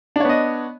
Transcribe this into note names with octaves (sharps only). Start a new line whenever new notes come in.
B3 D4 C#5 D#5